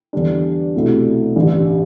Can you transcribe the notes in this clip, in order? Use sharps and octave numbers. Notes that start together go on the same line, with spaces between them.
E2 D3 G3 D4
C2 B2 A3 C4 E4
A1 G2 D3 G3